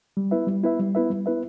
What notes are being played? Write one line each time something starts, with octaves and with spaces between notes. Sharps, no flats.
G3
B3 E4 B4 E5
G3
B3 E4 B4 E5
G3
B3 E4 B4 E5
G3
B3 E4 B4 E5